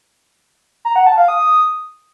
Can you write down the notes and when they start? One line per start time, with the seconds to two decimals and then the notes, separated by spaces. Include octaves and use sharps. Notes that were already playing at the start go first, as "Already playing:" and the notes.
0.85 A#5
0.96 F#5
1.07 A5
1.17 F5
1.28 D#6